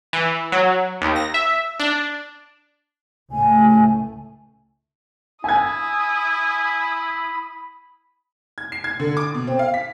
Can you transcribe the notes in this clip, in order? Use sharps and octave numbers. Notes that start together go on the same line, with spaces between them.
E3
F#3
D#2
A#6
E5
D4
C#2 A2 A3 G#5
E4 G#5 D#6 G#6
B5
G#6
C7
G#6
D3
D6
B2
C4
F5
B6